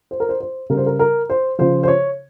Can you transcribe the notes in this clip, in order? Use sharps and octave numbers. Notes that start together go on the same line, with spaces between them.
C5
A#4
C5
C5
C#3 G3 A#4
C5
A#4
A#4
C5
C#3 F3 C5
C5
C#5